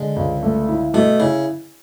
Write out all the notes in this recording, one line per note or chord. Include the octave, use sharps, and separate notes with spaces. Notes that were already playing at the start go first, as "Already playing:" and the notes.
Already playing: D3 G#3
C#2
A3
E4
B2 A3
C#3 E4